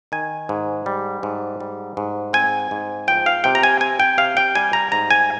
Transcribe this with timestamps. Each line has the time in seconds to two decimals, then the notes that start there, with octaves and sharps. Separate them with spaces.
0.12 D#3 G#5
0.49 G#2
0.86 G3
1.23 G#2
1.60 G3
1.97 G#2
2.33 C4 G#5
2.71 G#2
3.08 F3 G5
3.26 F5
3.44 C3 G5
3.55 A#5
3.63 G#5
3.81 C4 G#5
4.00 G5
4.18 C3 F5
4.37 G5
4.55 G3 G#5
4.73 A#5
4.92 G#2 A#5
5.11 G#5